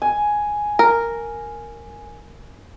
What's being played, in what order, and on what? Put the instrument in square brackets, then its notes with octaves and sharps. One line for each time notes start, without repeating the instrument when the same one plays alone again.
[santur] G#5
[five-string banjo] A#4